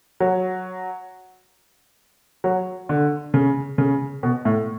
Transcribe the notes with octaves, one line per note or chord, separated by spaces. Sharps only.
F#3
F#3
D3
C#3
C#3
B2
A2